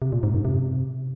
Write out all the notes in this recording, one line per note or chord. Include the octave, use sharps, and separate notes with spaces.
C3
A#2
G#2
F#2
C3